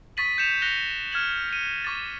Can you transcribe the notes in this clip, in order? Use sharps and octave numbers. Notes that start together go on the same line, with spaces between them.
C#6 D#6 A6 B6 D#7 F#7
G6 C#7 E7 F7
F#6 A#6 C#7 F7 G7
F6 G#6 E7 F#7
C#7 D#7
C#6 D6 F6 A6